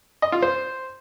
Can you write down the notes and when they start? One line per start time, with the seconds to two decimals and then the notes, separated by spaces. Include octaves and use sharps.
0.22 D#5
0.32 F4
0.42 C5